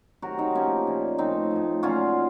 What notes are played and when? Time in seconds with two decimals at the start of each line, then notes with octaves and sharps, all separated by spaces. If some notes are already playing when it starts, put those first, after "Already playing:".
0.22 C3 D#3 F#3 F#4 A#4
0.39 C4 D#4
0.55 C3 F3 A#3 C#4
0.87 A#2 F3
1.18 A2 F3 C4 D#4
1.51 F3
1.56 A2
1.83 A#2 F#3 C#4 F4